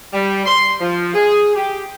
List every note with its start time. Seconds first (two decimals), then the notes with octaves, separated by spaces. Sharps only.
0.13 G3
0.46 C6
0.80 F3
1.14 G#4
1.56 G4